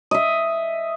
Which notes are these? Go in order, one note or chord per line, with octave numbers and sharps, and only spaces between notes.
D#5 E5